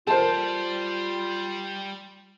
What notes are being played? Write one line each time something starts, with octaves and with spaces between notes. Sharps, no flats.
G3 F4 A4 A#4 C5 A5